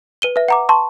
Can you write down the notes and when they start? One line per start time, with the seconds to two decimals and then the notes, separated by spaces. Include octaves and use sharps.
0.22 B4 D#7 G7
0.36 B4 E5
0.48 F#5 A#5 D6
0.69 A5 C6 C#6